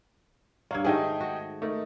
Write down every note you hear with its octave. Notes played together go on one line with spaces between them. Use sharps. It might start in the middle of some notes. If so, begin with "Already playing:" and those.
G2 A#3 C#5 F5 G#6
G#2 D#3 A3 D#4 G4 G#4
F#4
A3 D#4 A#4